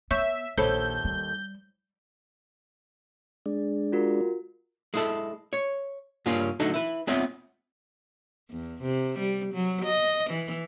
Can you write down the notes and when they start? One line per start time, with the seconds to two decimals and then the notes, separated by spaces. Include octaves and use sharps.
0.11 B3 C#5 E5 C#6 G6
0.58 A#1 D#2 A4 C5 C#5 B5 G6
1.05 G3
3.46 G#3 D4
3.92 F4 F#4 A#4
4.94 G#3 E4 A4
5.53 C#5
6.26 G2 C#3 A#3 C#4 F4
6.60 D3 F#3 A3 D#4 A4
6.74 E4 B4
7.07 G#3 B3 C4 F4 C#5 E5
8.50 E2
8.82 C3
9.18 G3
9.53 F#3
9.85 D#5
10.30 E3